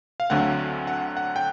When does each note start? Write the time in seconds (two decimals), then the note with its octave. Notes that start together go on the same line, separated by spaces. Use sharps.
0.20 F5
0.30 D2 D3 F#3 A3 C4 F#5
0.87 F#5
1.17 F#5
1.36 G5